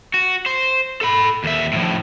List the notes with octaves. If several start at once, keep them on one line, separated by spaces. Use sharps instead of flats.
F#4
C5
A4 B5
D#2 E5
A2 F3